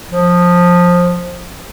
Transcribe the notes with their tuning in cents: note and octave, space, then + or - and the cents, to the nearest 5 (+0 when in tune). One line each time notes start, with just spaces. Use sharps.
F3 +15